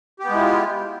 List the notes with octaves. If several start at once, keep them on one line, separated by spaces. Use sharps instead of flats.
G#3 B3 E4 F4 G4